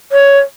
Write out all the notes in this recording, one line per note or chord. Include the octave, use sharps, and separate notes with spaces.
C#5